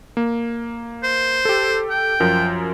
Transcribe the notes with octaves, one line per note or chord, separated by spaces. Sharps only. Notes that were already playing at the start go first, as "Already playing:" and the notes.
A#3
C5
G4 A4
G5
F#2 F3 A#4